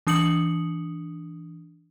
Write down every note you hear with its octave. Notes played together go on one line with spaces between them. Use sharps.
E3 D4 D#6 C#7 F#7